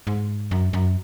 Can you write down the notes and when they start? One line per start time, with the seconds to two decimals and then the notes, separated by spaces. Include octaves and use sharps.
0.07 G#2
0.51 F#2
0.73 F#2